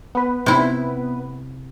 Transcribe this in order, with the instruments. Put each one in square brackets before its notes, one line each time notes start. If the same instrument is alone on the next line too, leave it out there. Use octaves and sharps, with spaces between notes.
[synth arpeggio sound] B3 B4
[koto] C3 E4